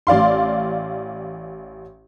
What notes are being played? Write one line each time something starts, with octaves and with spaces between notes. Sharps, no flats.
A1 D5 F5 C6